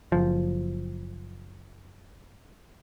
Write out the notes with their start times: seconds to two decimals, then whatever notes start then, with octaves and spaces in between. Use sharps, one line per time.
0.12 F#1 F3